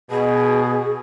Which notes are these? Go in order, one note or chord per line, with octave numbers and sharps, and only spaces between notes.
B2 G#4